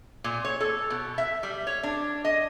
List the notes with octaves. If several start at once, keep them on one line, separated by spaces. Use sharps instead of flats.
A#2
C#5
A4
B2
E5
G3
C#5
D4
D#5